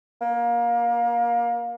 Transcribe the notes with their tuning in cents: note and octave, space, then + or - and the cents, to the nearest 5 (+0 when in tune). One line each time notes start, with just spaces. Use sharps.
A#3 +25